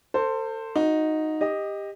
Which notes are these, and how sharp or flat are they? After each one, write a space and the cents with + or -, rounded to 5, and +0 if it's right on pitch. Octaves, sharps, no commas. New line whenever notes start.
A4 +35 C5 +0
D#4 +0 F#4 -20
G4 +20 D#5 +0